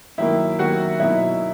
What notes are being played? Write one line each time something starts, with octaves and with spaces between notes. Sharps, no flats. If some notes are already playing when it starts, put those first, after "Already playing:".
D#3 F#3 A#3 E4 E5
D#3 F#3 A#3 F#4 F#5
B2 F#3 A#3 D#4 E4 E5